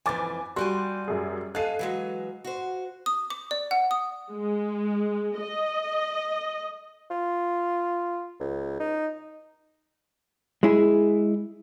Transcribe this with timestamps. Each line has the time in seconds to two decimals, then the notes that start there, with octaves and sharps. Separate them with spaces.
0.06 F2 G#2 E3 G#5 D6 A6
0.56 G3 F#4 G4 D5 G#5 C6 F#6
1.08 F#2 G#4
1.55 G#4 A4 D#5 F5 F#6 C7 D#7
1.79 E3 F#3 G#3
2.44 F#4 C5
3.06 D#6
3.30 D6
3.51 D5
3.71 F#5
3.91 D#6
4.33 G#3
5.40 D#5
7.11 F4
8.40 C#2
8.80 D#4
10.63 G#3 E4 G#4